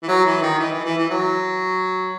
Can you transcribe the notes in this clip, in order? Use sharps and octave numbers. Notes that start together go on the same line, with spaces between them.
E3
F#3
E3
D#3
E3
E3
E3
E3
F#3